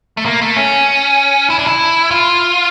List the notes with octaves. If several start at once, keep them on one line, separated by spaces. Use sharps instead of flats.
A3
A#3
A3
C#4
E4
D4
E4
F4